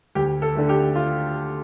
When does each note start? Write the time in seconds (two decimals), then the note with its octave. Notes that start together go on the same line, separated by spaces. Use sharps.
0.15 D2 G4
0.42 A4
0.56 D3 A3
0.69 G4
0.96 F4